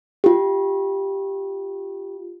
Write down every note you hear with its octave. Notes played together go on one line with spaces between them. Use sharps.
F4 G4